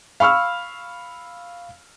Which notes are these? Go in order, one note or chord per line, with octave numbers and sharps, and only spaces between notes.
F5 B5 C#6 E6 F6